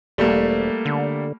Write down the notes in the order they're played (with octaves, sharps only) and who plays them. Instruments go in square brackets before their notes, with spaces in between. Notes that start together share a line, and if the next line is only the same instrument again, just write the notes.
[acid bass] E1 [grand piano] G3 A3 A#3
[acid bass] D3